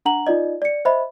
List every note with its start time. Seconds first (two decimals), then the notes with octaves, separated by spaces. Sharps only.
0.05 D4 F#5 A#5 F#7
0.27 D#4 F4 D5 D#5
0.62 D5 C#7
0.85 C5 D#5 E5 B5